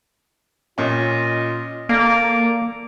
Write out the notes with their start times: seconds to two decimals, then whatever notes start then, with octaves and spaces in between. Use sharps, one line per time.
0.78 A#2 C#4 F4 D#5
1.89 A#3 A4 D5 A#5 D6